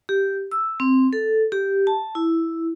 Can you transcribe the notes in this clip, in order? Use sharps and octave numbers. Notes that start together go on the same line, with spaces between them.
G4
E6
C4
A4
G4
A5
E4